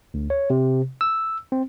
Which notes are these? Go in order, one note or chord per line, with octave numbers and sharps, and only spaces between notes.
D2
C#5
C3
E6
C4